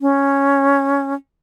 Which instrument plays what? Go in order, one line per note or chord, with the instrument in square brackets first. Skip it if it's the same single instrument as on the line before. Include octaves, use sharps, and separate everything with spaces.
[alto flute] C#4